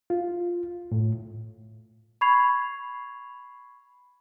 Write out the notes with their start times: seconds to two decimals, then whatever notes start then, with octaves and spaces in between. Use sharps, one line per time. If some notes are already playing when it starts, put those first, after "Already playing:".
0.10 F4
0.92 A2
2.21 B5 C#6 G#6 C7 F7